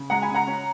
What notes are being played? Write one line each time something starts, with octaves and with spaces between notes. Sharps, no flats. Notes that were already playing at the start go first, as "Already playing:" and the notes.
Already playing: C#3
G#3 F#5 A#5
G#5 B5
C#3
F#5 A#5
C#4